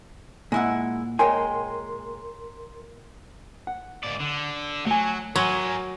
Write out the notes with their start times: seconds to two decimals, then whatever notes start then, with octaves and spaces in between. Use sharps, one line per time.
0.52 A#2 G#3 E4 F#5
1.19 A#2 G#3 A#4 C#5 G5 G#5 C6
3.67 F#5
4.04 G#2 D5
4.20 D3
4.86 F#3 A3 G#5
5.36 F#3 A#4 G#5 C6